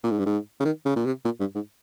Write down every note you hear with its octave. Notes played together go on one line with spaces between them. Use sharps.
A#2
G#2
G2
G#2
C#3
D#3
C#3
A#2
C3
A#2
G2
G#2